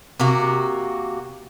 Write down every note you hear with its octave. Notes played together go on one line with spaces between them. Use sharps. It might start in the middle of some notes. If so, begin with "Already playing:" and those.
C3 A#3 F#4